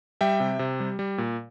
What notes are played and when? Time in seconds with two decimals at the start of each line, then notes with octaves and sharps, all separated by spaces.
0.21 G3 E5 G5
0.40 C3
0.59 C3
0.80 G3
0.99 G3
1.18 A#2